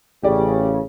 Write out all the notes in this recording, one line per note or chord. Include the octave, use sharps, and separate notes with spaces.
A1 C#3 G4 D5